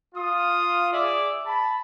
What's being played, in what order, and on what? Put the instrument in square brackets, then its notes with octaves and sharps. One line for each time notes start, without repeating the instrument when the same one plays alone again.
[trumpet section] F4 D#6
G#4 D5 E5 D6
A5 B5